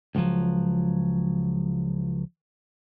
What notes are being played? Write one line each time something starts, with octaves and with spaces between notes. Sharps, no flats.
C#2 B2 D#3 F3 F#3